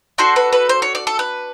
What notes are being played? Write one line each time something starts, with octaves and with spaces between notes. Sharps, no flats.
D4 F#4 A4 C5
B4
B4
C5
C#5
D5
A4
B4